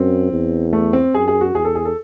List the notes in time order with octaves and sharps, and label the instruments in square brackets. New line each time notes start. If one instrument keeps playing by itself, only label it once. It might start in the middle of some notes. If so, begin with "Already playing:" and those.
Already playing: [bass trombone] F#2 [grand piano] C4
[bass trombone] E2
[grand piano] A3
C4
[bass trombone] F#2 [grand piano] G#4
[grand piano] G#4
F#4
[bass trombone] E2 [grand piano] G#4
[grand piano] A4
G#4
A4